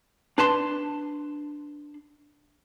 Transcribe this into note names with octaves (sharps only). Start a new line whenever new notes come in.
D4 B4 A5 C6